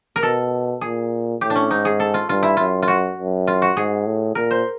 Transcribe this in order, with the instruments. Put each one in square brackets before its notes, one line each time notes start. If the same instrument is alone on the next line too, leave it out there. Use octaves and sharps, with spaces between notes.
[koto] A#4
[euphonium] B2 [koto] A4
[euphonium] A#2 [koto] G#4
[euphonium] A2 [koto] G4
[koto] D4
C#4
[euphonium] G#2 [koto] D#4
[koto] G#4
A4
F4
[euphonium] G2 [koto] F4
[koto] E4
[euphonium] F#2 [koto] F4
[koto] F4
F#4
[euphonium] F#2
[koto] F4
F#4
[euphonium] G#2 [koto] G#4
[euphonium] A2
[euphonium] A#2 [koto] A#4
[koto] C5